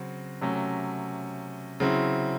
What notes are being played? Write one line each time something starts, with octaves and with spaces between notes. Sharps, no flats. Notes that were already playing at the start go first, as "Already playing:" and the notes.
Already playing: C#3 F#3 C4
C3 F#3 A3 C#4
C#3 F#3 C4 E4